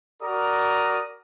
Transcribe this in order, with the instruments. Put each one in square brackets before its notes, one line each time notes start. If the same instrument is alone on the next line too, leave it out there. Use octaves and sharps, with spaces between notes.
[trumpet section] F#4 A#4 D5 A#5 D#6